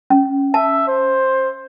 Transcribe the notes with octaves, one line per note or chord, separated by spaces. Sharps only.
C#4
E5 A5
C5